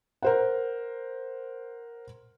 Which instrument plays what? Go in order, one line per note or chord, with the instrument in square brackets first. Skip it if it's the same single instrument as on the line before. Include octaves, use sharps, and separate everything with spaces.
[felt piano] A#4 C5 F#5